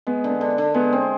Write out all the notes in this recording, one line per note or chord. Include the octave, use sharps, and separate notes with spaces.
G#3 B3
D3
B3
D3
D3
G#3 B3
C4